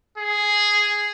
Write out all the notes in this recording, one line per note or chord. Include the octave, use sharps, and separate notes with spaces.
G#4